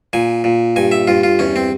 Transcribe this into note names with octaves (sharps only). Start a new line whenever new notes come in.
A#2 G#5
A#2
G2 G#5
E5
G2 F4
F4
E2 C#4
C4